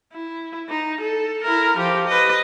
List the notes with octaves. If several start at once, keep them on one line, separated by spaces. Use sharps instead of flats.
E4
D#4
A4
E4 A#4
F3 G4
B4 D#5